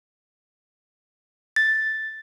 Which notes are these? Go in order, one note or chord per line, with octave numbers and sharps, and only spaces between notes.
A6